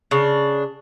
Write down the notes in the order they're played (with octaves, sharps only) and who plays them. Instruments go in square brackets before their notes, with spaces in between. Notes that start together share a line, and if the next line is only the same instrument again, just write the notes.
[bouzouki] C#3 D4